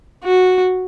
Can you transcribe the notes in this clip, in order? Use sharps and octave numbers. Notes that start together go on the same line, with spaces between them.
F#4